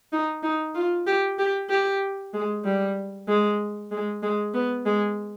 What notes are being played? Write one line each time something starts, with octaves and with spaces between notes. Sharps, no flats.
D#4
D#4
F4
G4
G4
G4
G#3
G3
G#3
G#3
G#3
B3
G#3